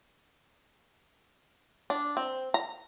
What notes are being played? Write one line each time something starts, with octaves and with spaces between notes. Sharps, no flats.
D4
C4
A#5